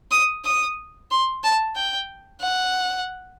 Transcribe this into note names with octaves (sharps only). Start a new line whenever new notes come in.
D#6
D#6
C6
A5
G5
F#5